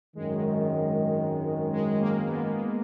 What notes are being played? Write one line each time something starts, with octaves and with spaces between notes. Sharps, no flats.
G#1 F#2 D#3 G#3
G#3
A#3
B3
G#3